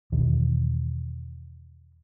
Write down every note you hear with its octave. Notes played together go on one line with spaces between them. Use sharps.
E2 B2 D#3 E3